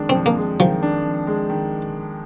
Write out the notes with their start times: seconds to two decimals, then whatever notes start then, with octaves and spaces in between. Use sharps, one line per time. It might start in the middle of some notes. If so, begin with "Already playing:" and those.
Already playing: F2 D#3 G#3 D4
0.09 C4
0.15 F2
0.26 A#3
0.37 G#3
0.60 D#3 F3
0.82 D4
1.05 F2
1.27 G#3
1.50 D#3